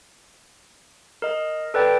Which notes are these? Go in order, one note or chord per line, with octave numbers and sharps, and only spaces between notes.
A#4 D#5
A4 B4 D5 G5